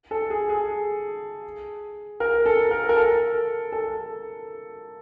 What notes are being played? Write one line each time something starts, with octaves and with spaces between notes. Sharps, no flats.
A4
G#4
G#4
A#4
A4
A#4
A#4
A4
A4